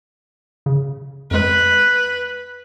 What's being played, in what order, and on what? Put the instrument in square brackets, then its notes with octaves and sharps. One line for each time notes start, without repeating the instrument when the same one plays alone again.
[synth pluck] C#3
[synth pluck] F2 G#3 [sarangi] B4